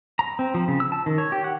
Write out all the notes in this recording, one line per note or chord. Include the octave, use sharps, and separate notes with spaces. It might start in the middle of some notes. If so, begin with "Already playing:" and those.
A#5
C4
F3
C#3
E6
A5
D#3
C#5
G4
F#5